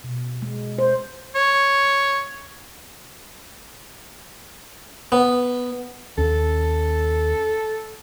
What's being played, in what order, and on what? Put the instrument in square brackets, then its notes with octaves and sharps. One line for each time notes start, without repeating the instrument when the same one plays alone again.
[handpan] B2
G#3
C5
[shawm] C#5
[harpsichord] B3
[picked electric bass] D#2 C#4 [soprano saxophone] A4